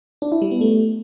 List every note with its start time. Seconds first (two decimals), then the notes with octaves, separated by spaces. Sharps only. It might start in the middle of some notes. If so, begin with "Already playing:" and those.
0.22 D4
0.32 E4
0.42 G3
0.51 B3
0.61 A3